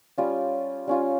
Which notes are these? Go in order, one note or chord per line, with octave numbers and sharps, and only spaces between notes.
G3 C#4 F4
G3 C#4 F4